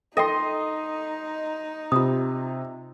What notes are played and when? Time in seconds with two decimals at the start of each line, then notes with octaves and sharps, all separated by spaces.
0.17 D#4 A4 D#5 G5 C6
1.92 C3 F4 D#6